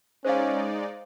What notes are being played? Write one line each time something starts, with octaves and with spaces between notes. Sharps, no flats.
G#3 C#4 D#4 C5 D5 F5